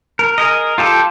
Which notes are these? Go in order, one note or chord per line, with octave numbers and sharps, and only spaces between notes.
A#4
G#4 A#4 D#5
F4 G4 A4